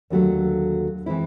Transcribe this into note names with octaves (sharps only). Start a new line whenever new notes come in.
D#2 D3 F#3 A3
E3 G#3 C4 E4